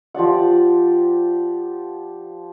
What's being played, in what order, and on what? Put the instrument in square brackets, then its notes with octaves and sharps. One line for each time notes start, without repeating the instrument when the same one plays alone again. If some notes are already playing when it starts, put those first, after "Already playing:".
[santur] F3 G4 D5 F#5